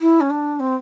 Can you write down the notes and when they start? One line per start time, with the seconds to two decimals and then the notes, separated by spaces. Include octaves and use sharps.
0.01 E4
0.21 C#4
0.30 D4
0.60 C4